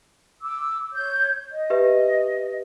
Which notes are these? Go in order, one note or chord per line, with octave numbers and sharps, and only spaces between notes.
D6 E6
C#5 G6
D#5
G4 B4 E5